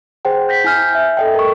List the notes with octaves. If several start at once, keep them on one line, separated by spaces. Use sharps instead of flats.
G#4 C5 F#5 G5
G6 A#6 B6
E4 G#5 F6 G6
E5
A4 D#5 G5
A#4 C#6